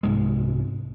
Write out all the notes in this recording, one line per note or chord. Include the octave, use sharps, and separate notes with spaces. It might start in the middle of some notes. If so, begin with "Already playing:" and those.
C2 G#2 G#3